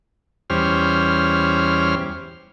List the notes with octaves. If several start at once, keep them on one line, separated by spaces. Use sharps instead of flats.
E2 G3 C#4 C5 F6